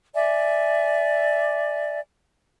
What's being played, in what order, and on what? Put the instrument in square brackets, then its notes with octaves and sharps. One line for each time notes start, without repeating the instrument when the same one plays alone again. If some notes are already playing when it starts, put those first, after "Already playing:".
[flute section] D5 E5 G#5